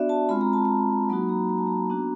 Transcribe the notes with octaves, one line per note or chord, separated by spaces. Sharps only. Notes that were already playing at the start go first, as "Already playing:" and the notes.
Already playing: B3 D4 F#4 D5 E5
A5
G#3 C4 F4 B5
A#5
A5
A#5
F#3 A#3 D#4 F#4 B5
A#5
A#5
A5
A#5
B3 D4 F#4